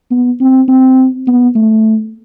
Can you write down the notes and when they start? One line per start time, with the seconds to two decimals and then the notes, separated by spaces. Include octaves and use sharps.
0.11 B3
0.41 C4
0.68 C4
1.28 B3
1.55 A3